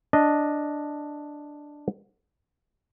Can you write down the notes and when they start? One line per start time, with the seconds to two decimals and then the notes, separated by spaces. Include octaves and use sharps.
0.13 D4 D#5